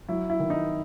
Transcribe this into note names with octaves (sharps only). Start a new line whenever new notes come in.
F#3 E4
E4
D#3
D#4